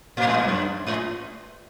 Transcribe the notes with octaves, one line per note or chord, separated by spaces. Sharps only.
A2
G#2
G2
F#2
G#2